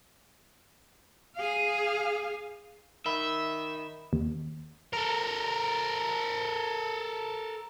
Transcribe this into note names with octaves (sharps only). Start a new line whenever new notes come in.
G#4 F5
D#3 E5 B5 G7
D#2
A4 A#4